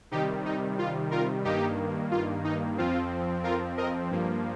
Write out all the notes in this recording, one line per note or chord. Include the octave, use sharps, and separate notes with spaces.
C3 D#3 G3 D#4 G4
D#4
F4
F4 A#4
G2 D#3 A#3 D#4 G4
F4
D#4
F2 F3 C4 F4
F4 A#4
A#4 D#5
G2 F3 A#3